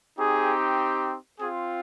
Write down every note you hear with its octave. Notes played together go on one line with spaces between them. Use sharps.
C4 D#4 G4 G#4
C4 F4 G#4